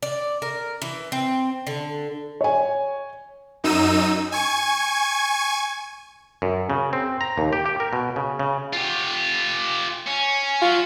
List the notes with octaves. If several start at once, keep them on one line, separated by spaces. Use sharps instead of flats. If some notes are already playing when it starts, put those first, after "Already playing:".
D5
A#4
E3
C4
D3
C#5 G#5
F#2 D#4 E6 D#7
G#5 C#6 G#6
F#2
C#3
C4
A#5
D#2
G4
G4
A#4
B2
C#3
C#3
F4 G4
C#4
F#3 F4